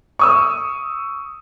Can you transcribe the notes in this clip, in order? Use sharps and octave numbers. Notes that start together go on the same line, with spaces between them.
C#6 D#6 E6